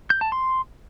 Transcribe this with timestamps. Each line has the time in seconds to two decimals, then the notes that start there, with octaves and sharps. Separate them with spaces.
0.10 G6
0.21 A5
0.32 C6